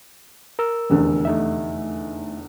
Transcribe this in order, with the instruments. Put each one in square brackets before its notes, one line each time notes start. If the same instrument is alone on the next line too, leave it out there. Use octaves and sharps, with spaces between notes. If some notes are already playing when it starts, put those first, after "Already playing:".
[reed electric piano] A#4 E6
[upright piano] F1 E2 D3
[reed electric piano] A3 D#4 E5